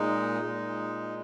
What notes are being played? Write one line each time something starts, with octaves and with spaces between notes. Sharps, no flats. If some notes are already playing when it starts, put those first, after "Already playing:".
Already playing: A#2 G#3 D#4
A#2 G#3